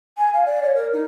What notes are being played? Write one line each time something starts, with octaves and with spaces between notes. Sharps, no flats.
G#5
F5
D5
C#5
A#4
D#4